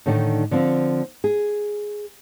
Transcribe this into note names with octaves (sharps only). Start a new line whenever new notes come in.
A2 D3 D#3 A3 D4 D#4
D3 F3 C4
G#4